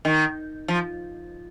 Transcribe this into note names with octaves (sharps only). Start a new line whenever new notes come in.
D#3
F3